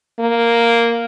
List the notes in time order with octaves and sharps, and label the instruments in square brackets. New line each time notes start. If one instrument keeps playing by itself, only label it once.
[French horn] A#3